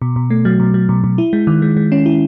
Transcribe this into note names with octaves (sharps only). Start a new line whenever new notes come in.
B2
B2
A3
F#3
B2
F#3
B2
B2
E4
G#3
D#3
G#3
G#3
C#4
E4